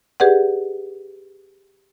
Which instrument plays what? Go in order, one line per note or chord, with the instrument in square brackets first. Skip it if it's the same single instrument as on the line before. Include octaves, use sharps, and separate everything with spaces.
[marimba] G4 G#4 B4 D5 F#5